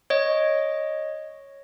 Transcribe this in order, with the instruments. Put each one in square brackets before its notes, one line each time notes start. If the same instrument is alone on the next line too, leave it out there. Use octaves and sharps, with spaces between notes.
[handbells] C#5 D#5